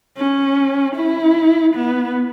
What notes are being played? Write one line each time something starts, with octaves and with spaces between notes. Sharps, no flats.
C#4
E4
B3